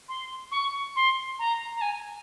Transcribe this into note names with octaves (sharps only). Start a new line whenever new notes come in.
C6
C#6
C6
A#5
A#5
G#5